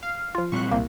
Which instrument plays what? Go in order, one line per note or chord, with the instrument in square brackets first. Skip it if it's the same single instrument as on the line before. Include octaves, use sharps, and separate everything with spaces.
[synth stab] F5
[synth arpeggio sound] F3 F4
[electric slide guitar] A#2 G3 C4 [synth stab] C#6 F#6
[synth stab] C2 [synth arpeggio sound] A#3